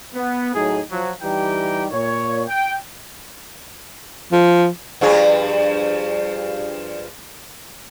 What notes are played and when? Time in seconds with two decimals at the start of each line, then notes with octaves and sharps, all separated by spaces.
0.14 B3
0.54 A2 F#3 D#4 G#4
0.91 F3 F#3
1.22 E3 G3 D#4 G4 G5 A#5
1.91 A#2 C#5
2.47 G5
4.32 F3
5.01 G2 F3 G#4